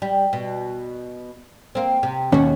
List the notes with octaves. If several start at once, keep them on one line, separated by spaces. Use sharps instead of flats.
G3
B2
A#3 C4
C3
D#2 B2 C#4 F#4